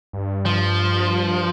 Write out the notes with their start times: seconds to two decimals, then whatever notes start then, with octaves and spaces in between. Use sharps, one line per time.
0.13 G2
0.45 F3